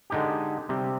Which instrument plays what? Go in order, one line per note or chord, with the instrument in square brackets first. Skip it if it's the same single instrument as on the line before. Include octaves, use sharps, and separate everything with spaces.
[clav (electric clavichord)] D3 G#3 D#4 G4
C3 G3 C4